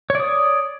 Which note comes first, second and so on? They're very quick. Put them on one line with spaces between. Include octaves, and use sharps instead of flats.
C#5 D5 D#6